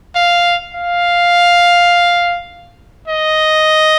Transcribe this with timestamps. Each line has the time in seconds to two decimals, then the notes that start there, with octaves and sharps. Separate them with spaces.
0.15 F5
0.75 F5
3.08 D#5